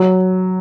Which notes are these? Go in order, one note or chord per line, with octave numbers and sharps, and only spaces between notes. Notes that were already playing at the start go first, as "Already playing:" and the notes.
Already playing: F#3